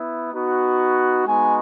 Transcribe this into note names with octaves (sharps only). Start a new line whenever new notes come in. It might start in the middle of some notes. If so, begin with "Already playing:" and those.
Already playing: B3 E4
B3 D#4 F#4
G#3 B3 D#4 F#4 G#5